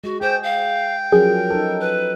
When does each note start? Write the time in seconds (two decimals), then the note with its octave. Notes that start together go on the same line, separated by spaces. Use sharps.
0.04 G#3 F#4
0.21 G#4 C5 G5
0.43 F5 G5
1.12 F3 F#3 C#4 G#4 A#4
1.50 D#4 A4
1.80 B4